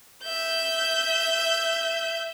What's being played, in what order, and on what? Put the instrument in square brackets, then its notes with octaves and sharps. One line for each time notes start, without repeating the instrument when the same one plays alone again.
[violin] E5 G6